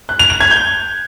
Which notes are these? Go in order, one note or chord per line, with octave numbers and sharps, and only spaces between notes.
F#6
F7
F7
G#6
G6